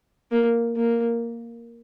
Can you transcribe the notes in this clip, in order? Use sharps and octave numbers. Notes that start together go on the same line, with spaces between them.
A#3
A#3